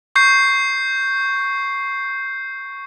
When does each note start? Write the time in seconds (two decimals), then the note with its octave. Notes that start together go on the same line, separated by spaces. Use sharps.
0.16 C#6 G6 C7